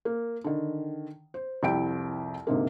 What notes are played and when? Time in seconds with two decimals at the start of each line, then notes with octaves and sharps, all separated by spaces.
0.05 A#3
0.44 D3 D#3
1.34 C5
1.63 C2 F2 E4 G4 G5 D7
2.47 D2 G#2 C3 A#3